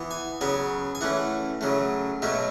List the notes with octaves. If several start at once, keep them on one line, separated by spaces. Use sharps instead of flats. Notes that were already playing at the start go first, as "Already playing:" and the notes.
Already playing: E3 B3
G#5
C#3 F#3 B3 G#5
G#5
E3 A3 C#4 F#5
C#3 F#3 A3
B2 F#3 A3 C#4 E5